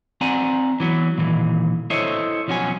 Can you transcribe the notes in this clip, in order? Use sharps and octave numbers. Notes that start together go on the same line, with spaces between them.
C4 D5 F#5 G#5 A#5
E3 F#3 B3
A#2 D#3 E3
E4 A4 C5 C#5 D#5 E5
B1 F3 C#4 F#4 C#5 G#5